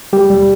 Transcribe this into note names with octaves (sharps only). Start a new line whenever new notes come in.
G3 G4
G3